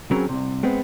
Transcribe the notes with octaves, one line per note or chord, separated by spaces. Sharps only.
C#3 F#3 C4 C#4 A#4
C2 C3
G#3 B3 C4